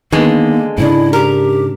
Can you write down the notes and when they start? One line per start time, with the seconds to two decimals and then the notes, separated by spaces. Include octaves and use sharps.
0.12 D3 D#3 G#3 A#3 B3
0.78 G#2 C#3 D4 E4
1.13 G4 A#4